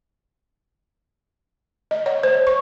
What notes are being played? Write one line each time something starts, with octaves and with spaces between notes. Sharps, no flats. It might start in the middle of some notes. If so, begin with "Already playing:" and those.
D#5
C#5
C5
C#6